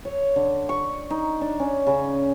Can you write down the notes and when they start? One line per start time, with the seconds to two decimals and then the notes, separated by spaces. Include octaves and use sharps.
0.05 C#5
0.36 D3
0.69 C#6
1.10 D#4
1.41 D4
1.59 C#4
1.87 C#3